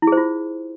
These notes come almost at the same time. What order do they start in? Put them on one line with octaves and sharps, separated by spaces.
E4 G#4 C5 F4